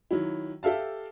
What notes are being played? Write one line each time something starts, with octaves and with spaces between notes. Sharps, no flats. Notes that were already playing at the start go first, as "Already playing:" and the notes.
D#3 F#3 E4
G4 A4 E5 F5 A5